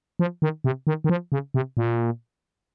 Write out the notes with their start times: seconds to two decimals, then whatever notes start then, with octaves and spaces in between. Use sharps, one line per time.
0.19 F3
0.42 D#3
0.64 C3
0.87 D#3
1.04 D#3
1.09 F3
1.32 C#3
1.54 C3
1.77 A#2